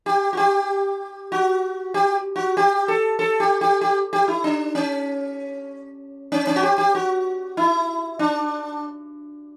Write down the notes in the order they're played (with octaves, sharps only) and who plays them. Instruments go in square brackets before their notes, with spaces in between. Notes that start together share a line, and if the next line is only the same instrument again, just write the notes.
[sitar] G4
F#4
G4
F#4
G4
F#4
G4
A4
A4
G4
G4
G4
G4
E4
D4
C#4
C#4
C#4
F#4
G4
G4
F#4
E4
D4